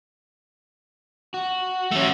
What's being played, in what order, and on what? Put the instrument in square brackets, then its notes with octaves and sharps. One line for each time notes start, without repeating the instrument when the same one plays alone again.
[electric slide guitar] F#4
[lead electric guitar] A3 C#4